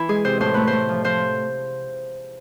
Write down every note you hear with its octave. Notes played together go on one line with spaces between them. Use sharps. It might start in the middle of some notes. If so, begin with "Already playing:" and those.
Already playing: E3 E4
G#3 G#4
C3 C5
A2 C5
A3 B4
C5
A3
F3
F3 C5